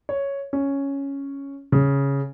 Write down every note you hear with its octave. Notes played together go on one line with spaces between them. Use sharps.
C#5
C#4
C#3